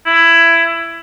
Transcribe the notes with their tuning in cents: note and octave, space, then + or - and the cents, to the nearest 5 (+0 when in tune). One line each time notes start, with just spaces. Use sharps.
E4 +15